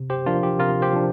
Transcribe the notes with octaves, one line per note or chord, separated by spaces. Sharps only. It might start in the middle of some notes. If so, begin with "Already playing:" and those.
Already playing: C3
G4 C5
F3 D4 F4 A#4
G4
C3 F4 A#4
G4 C5
F3 D4